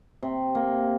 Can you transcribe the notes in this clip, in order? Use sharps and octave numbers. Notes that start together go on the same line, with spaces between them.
C3
A#3